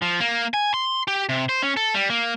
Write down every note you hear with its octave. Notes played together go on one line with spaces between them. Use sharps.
F3
A#3
G#5
C6
G4
C3
C5
C#4
A4
G3
A#3